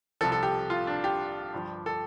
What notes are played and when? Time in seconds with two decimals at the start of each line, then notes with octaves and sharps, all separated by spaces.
0.21 C2 C3 F3 A4
0.32 A4
0.43 G4
0.70 F4
0.87 D4
1.04 G4
1.53 G1 G2 F3
1.86 A4